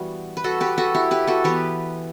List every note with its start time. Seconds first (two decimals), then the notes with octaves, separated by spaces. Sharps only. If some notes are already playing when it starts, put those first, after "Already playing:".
Already playing: E3 G3 B3 F#4
0.37 B4
0.44 F#4 A4
0.60 G4 B4
0.78 F#4 A4
0.95 E4 G4
1.11 G4 B4
1.27 F#4 A4
1.44 E3 B3 G4 B4